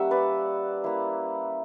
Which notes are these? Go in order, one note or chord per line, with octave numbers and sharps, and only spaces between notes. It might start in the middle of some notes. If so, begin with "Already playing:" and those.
Already playing: G3 A#3 C#4 E5 F#5
B4 D5
A#3 E4